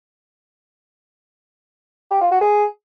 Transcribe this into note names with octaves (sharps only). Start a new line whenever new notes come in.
G4
F4
F#4
G#4